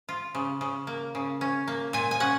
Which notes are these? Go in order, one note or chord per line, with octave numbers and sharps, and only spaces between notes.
F4
C#3
C#3
A#3
C#3
C#4
A#3
A#2 G#5
G#5
C#4 F#5